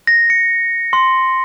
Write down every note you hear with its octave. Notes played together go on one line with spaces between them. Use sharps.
A#6
C#7
C6